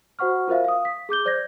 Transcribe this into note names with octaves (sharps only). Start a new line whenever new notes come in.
F#4 C5 F#5 C#6 F6
F4 A#4 C5 E5 F5
F5 D#6
B6
G#4 D6 G6 G7
C5 D5 G6 G#6 A#6